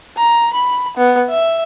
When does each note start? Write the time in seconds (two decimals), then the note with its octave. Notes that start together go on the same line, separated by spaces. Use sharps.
0.17 A#5
0.53 B5
0.97 B3
1.29 E5